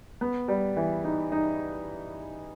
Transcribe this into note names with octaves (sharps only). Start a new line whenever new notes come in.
B3
G3
E3
D#4
D#4